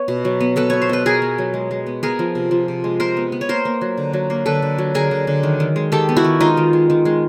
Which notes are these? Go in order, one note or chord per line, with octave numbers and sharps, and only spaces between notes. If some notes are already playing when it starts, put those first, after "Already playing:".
Already playing: B3 C#5
B2
F#3
B3
B3 A4 B4
B3 C#5
C5
B2 B4
B2 G#4 A#4
B3
F#3
G#3
G#3
B3
B3 G#4 A#4
F3
C3
F3
C3
G#3
C3 A#4 C5
B3
B3
C#5
A#3 A#4 C5
A#3
F#3
D3
F#3
A#3
D3 A4 B4
D3
F#3
D3 G#4 A#4
D3
D3
D#3
D#3
G#3
D#3 G4 A4
B3
E4 F#4
D#3
G#3 D#4 F4
D#3
G#3
D#3
G#3